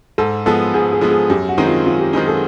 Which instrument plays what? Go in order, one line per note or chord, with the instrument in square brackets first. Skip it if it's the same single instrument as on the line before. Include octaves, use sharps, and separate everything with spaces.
[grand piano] G#2 [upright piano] A4
[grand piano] F3 G#3 B3 [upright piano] A4
[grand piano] G#2 [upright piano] G#4
[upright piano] G#4
[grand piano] F3 G#3 B3
[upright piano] G#4
[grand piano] F#2 [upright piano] G4
[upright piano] F#4
[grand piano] D#3 G#3 C4 D#4
[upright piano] F4
[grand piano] F#2 [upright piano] F4
[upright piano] G4
[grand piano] D#3 G#3 C4 D#4 [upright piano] G#4
[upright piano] A4